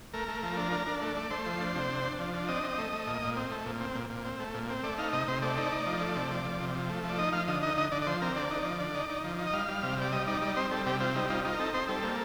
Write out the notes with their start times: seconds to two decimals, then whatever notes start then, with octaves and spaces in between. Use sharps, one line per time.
0.13 A3 A#4
0.28 A3
0.43 F3
0.57 D4
0.72 D4
0.87 D4
1.02 A3
1.17 A3 D5
1.31 A3 C5
1.46 F3
1.60 D4
1.75 C3
1.90 D4
2.04 D4
2.19 F3
2.34 D4
2.48 C4 D#5
2.63 C4
2.78 A3
2.93 A3
3.07 A#2
3.22 A#2
3.36 C4
3.52 A3
3.66 A#2
3.81 C4
3.95 A#2
4.10 A#2
4.25 C4
4.40 A3
4.54 A#2
4.69 C4
4.84 A3 D5
4.98 D#4 F5
5.13 C3 D#5
5.28 C3 C5
5.42 A3 D5
5.57 D#4
5.72 D#4
5.86 F3
6.01 A3
6.16 C3
6.30 F3
6.45 F3
6.60 C3
6.75 F3
6.89 A3
7.04 F3
7.09 D5
7.19 D#4 D#5
7.33 F3 F5
7.48 D3 D#5
7.63 D#4 D#5
7.77 D3 D#5
7.92 D3 D5
8.02 D5
8.07 F3 C5
8.22 C4 A#4
8.35 D3 D5
8.51 D#4
8.65 F3
8.80 D3
8.95 D#4
9.10 D#4
9.24 F3
9.39 D#4
9.47 D#5
9.53 G3 F5
9.68 G3
9.83 C3
9.98 G3 D5
10.12 G3 D#5
10.27 D#4 D5
10.41 G3 D5
10.56 C4 C5
10.71 G3 A4
10.86 C3 G4
11.00 C4 F4
11.15 G3 D#4
11.30 D#4 F4
11.45 D#4 F4
11.53 A#4
11.59 C4 A4
11.74 C4 C5
11.88 G3 A4
12.03 A#3